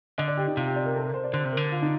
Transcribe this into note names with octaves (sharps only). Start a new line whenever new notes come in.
D3 D#5
D5
G4
D#4
C3 F4
G4
D5
A#4
A4
A#4
C5
D5
D3 C5
C3
A#4
D3
F4
D#4